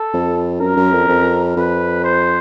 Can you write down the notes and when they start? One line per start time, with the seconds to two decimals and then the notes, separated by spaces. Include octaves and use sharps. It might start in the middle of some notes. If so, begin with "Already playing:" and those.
Already playing: A4
0.13 F2
0.60 F#2 A#4
0.77 F#2
0.93 F2
1.08 F2
1.56 F2 B4
2.04 C5